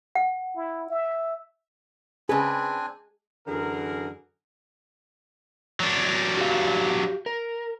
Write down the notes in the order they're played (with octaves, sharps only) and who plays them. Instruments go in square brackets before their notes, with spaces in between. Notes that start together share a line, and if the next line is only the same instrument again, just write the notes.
[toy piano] F#5
[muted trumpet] E4
E5
[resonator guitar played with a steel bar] C#3 B4 [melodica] C4 D4 G#5 [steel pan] G#4
[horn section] F#2 D3 E3 G#4 A#4
[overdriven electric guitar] F#3 D4
[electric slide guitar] F#4 G4 F5
A#4